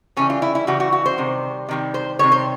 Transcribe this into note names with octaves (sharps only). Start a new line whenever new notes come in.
C#3 E3 G3 C#4
F4
E4
E4
C#3 E3 G3 F#4
F#4
F#4
C5
C3 D#3 G3
C3 D#3 G3
C5
C3 D#3 G3 C#5
C5